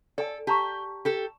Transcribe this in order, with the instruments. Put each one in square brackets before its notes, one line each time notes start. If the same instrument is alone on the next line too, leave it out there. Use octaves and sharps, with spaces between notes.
[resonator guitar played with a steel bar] A4 [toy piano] D5 G#5
[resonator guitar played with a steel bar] G4 [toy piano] A5 A#5 C#6
[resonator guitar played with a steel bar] G4 A4